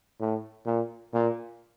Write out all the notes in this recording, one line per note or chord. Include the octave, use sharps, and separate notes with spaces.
A2
A#2
A#2